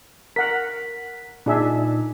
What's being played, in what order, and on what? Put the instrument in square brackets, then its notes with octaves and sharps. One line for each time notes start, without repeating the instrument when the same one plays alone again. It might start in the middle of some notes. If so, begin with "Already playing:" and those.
[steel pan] A#4 F#5 [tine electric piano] B6
[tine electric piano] A#2 D#4 [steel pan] D4 G#4 E5